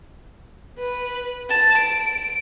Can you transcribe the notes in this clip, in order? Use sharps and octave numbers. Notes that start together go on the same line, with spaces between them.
B4
A5
D7